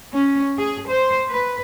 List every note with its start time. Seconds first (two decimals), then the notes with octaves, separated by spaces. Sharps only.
0.13 C#4
0.58 G#4
0.88 C5
1.31 B4